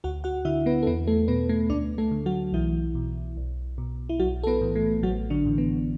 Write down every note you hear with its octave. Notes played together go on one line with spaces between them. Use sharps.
D2 F#4 F#5
F#4 F#5
D3 E4 E5
B3 B4
A4
E2 B3 B4
A3 A4
B2 B3 B4
A3 A4
D2 D4 D5
A3 A4
D3
F#3 F#4
B1 E3 E4
B2
B1
B2
E4
B1 F#3 F#4
A4
B3 B4
A2 E3
A3
A1 F#3 F#4
D3 D4
A2 E3
B3